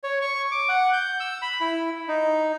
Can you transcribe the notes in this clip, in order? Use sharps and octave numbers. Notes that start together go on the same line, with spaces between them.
C#5
C#6
D6
F#5
G6
E6
B5
E4
D#4